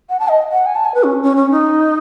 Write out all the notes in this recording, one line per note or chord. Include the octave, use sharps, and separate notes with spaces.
F#5
A5
D#5
F#5
G#5
A5
G#5
B4
C#4
C#4
C#4
D#4